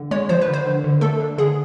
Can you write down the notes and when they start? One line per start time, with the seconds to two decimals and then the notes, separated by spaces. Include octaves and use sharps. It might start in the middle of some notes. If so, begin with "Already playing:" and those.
Already playing: D3
0.11 G#3 C#5
0.29 F3 C5
0.41 B4
0.48 D3
0.53 C5
0.66 D3
0.84 D3
1.01 A3 A4
1.20 D4
1.38 D3 G#4